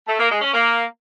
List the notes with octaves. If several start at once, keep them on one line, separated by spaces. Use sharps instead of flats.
A3
A#3
G#3
C#4
A#3